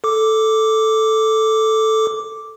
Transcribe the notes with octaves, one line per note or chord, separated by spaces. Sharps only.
A4 D6